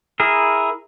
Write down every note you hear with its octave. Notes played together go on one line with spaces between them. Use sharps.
E4 G#4 A#4